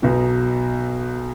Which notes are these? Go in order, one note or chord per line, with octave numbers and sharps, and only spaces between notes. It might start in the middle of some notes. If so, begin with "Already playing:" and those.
B1 B2 F#3